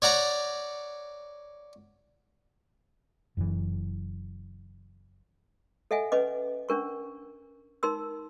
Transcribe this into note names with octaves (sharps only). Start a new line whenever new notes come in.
C#5 D5 F#5 A#5
F#1 F#2 C#3 E3
A4 D#5 E5 F#5 G#5
C#4 B4 D#5 D6
C#4 D4 A#4 C#6
D#4 A#4 C6 E6